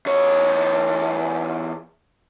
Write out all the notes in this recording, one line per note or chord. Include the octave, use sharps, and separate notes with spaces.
E2 C#5